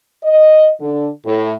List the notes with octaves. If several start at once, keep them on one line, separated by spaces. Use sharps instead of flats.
D#5
D3
A2